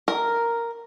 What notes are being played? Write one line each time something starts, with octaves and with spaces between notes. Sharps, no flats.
A#4